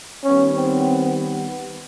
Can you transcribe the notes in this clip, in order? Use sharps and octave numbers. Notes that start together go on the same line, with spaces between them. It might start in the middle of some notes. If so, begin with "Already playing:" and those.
D#3 G3 B3 C#4
C4